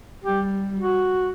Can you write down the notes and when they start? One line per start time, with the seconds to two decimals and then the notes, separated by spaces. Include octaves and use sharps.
0.24 G3 G4
0.80 F#4